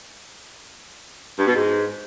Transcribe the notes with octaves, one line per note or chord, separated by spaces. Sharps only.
G2
B2
G#2